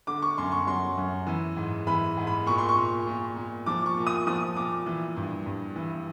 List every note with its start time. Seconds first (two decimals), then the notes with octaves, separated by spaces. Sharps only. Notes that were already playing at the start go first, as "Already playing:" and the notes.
0.07 D3 D6
0.22 C#6
0.38 F#2 C6
0.52 C#6
0.67 F#3 C6
0.97 F#2
1.27 E3
1.57 G#2
1.87 E3 B5
2.17 G#2
2.27 B5
2.47 A#2 C#6
2.58 C6
2.69 C#6
2.76 A#2
3.07 A#2
3.36 A#2
3.66 F3 D6
3.86 C#6
3.97 A#2
4.07 D#6
4.27 F3 D#6
4.56 A#2 D6
4.86 E3
5.17 G2
5.46 G2
5.76 E3